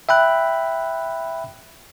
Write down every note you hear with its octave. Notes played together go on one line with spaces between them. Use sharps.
E5 G5 B5 F#6